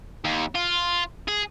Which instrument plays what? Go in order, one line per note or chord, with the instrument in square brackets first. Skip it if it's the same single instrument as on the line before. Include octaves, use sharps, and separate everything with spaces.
[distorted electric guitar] D#2
F4
G#4